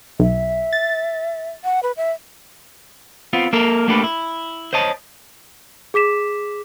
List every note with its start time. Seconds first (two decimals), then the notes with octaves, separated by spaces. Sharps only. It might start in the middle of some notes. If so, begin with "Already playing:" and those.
0.20 B1 E5
0.73 A6
1.64 F#5
1.83 B4
1.97 E5
3.33 B3 C4 F4
3.53 A#3 A4 A#4
3.88 A3 A#3 D4 G4 A4 B4
4.04 E4
4.73 C5 C#5 D#5 A5
5.94 G#4 D6 B6 E7